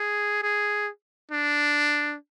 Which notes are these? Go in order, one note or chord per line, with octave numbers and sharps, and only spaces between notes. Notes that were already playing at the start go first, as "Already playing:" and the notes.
Already playing: G#4
G#4
D4